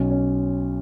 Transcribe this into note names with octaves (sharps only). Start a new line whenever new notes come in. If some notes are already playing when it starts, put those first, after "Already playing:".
Already playing: B1 B2 C#4
C#4